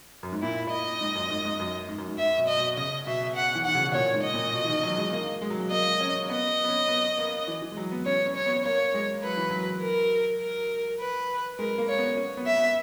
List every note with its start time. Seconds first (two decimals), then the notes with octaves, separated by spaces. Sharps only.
0.23 F#2
0.32 G#2
0.42 A#2 E4
0.71 D#5
1.01 G#2
1.15 F#2
1.30 G#2
1.45 G#2
1.60 F#2
1.89 G#2
1.98 F#2
2.08 G#2
2.18 G#2 E5
2.38 B2
2.48 D#5
2.57 B2
2.77 C#3 D#5
3.07 B2 E5
3.36 F#5
3.55 E3
3.65 D#3 F#5
3.75 C#3
3.85 B2
3.94 A#2 C#5
4.14 G#2
4.24 D#5
4.34 A#2
4.53 B2
4.64 E3
4.68 D#3
4.83 F#3
4.97 G#3
5.13 A#3
5.42 G#3
5.50 F#3
5.59 G#3
5.71 A#3 D#5
6.01 C#4
6.30 B3 D#5
6.64 B3
6.69 C#4
6.88 B3
7.18 A#3
7.48 E3
7.62 E3
7.72 G#3
7.77 F#3
7.92 B3
8.05 C#4 C#5
8.26 C#4
8.36 C#5
8.46 B3
8.65 A#3 C#5
8.94 G#3
9.24 F#3 B4
9.37 E3
9.50 F#3
9.82 A#4
10.41 A#4
11.00 B4
11.58 G#3 A#4
11.78 A#3
11.88 C#5
11.98 B3
12.17 C#4
12.37 B3
12.47 E5
12.57 B3